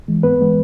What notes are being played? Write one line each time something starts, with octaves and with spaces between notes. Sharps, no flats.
E3 G#3
G#2 B3 B4
E3 G#3 B3